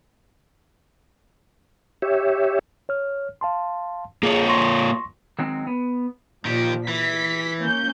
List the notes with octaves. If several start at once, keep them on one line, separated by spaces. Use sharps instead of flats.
G4 C#5 E5
C#5 F6
F5 A5 C6
A#3 F4 G#4 C#5
C6 C#6 A#6
D#3 F#3 G#3 C4
B3
A#2 D#3 F3 G4
E3 B6
A#3 C#4 G6